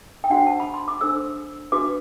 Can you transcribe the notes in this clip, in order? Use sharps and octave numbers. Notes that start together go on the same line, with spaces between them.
G5
D4 F#4 C5 F#5
A5
B5
C6
D6
D4 A4 C5 E6
D4 F#4 B4 D6